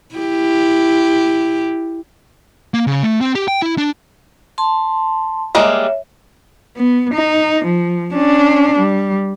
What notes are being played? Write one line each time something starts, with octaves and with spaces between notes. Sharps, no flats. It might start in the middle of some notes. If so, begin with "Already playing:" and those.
E4 G4
A#3
C#3
A3
C4
G4
G5
E4
D4
A5 C6
G3 G#3 A#3 C#5 E5
B3
D#4
F3
C#4 D4
G3